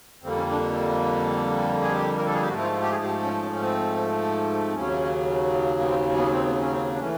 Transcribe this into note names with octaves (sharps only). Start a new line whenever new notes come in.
F2 D3 G3 A#3 C4
C#4
D4
G#4
G4
A#4
A4
G#4
G4
G#2 F3 A3 F#4
E4
F4
G4
G#4
G4
C#4
C#4
C#4
C4
C4
D#2 C#3 F#3 C#4
B3
C4
B3
C4
B3
C#4
C4
D4
E3 A3 C#4